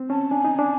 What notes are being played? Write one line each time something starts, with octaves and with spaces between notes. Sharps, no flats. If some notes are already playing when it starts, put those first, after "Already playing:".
Already playing: C4
C#4 A5
D4 G#5
D#4
D4